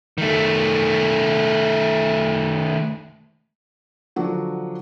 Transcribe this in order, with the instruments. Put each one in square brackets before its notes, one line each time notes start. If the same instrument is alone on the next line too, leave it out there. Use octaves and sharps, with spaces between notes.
[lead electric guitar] D#3 A3
[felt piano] D3 F3 F#3 D4 F#4